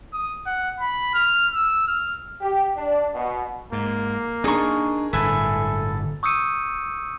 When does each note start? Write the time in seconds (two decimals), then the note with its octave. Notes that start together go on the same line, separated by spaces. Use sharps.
0.13 D#6
0.46 F#5
0.80 B5
1.14 F6
1.53 E6
1.88 F6
2.41 G4
2.77 D4
3.15 B2
3.72 G#2 A#3
4.44 C4 D4 D#4 G#4 A#4 A#5 C#6
5.13 G1 A2 D3 A4 B4 E5 G#5
6.23 C#6 D#6 E6 G6 C#7 D#7